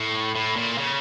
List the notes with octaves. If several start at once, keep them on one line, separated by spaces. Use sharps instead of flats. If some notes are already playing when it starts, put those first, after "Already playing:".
Already playing: A2
A2
A#2
C#3